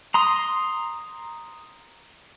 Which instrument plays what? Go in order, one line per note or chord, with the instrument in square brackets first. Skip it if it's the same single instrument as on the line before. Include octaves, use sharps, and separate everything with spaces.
[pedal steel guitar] A#5 C6 D#6